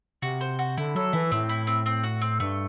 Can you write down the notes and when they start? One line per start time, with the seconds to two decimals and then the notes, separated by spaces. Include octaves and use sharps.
0.22 C3 F#4
0.41 C5
0.59 F#4
0.77 D3 E4
0.95 F#3 A4
1.13 E3 E4
1.32 A2 C4
1.49 E4
1.67 C4
1.86 C4
2.03 F#4
2.21 C4
2.40 G2 A3